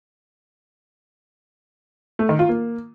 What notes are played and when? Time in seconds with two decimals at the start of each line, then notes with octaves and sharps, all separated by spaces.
2.19 A3
2.29 D#3
2.39 F4
2.49 A#3